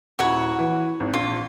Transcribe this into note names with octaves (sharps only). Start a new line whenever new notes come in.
D#1 E4 F#4 C#5 F#5
E3
G#1
A#1 F4